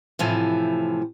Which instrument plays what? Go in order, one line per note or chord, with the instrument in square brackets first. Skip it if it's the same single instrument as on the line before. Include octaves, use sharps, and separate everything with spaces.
[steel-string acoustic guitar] A2 C3 E3 F3